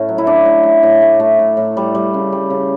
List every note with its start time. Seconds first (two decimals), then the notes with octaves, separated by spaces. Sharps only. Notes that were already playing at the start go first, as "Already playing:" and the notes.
Already playing: A2 A3 C#4
0.09 F#3
0.18 E4
0.26 F#3 D4
0.45 A2
0.64 A3
0.83 A2
1.02 A3
1.20 A3
1.39 A2
1.57 A2
1.77 G3
1.95 G3
2.14 C#3
2.32 G3
2.50 C#3